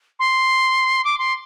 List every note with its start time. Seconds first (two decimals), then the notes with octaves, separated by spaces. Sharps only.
0.19 C6
1.05 D6
1.18 C6